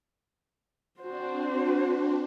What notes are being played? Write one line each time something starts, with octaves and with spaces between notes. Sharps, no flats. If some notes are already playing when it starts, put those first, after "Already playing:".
C4 D4 F#4 C5